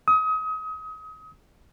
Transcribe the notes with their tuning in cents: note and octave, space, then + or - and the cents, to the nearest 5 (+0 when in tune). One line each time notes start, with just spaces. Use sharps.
D#6 +30